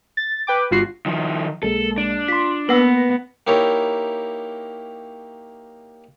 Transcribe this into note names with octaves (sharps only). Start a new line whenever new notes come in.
A6
B4 G5 D6
G1 G2 F4 F#4 C7
D#3 F3
B1 G#3 A#3 A4
D4 D7
F4 C6 B6
A#3 B3 B4 F#5 E6 A#6
A#3 D#4 E4 G4 A#4 C#5